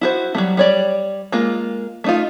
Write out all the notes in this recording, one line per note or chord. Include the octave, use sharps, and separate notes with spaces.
E4 F#4 C5
F#3 G3 A3
G3 C#5 D5
G#3 A#3 F4
A3 D#4 F4